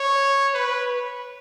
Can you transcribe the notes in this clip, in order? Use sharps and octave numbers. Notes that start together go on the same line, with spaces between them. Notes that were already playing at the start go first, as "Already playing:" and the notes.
Already playing: C#5
B4